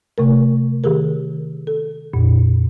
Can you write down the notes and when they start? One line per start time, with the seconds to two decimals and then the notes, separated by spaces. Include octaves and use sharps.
0.18 C3 A3 A#4
0.84 D#3 G4 G#4 A#4
1.67 A4
2.14 F2 A#2